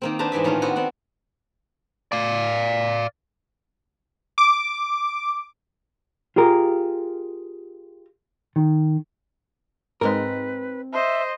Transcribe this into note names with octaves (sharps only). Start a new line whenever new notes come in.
D#3 A#3 C4
D4 B4 C5 A5 A#5
G#2 E3 G4 E5
A2 D#3 C#4 D4 F4
B3 C4 F#4
B3 C4 D4 F#5
D5 F5
D6
F4 G4 G#4 A#4
D#3
G#2 G#3 C4 A#4 B4
C5 D#5 E5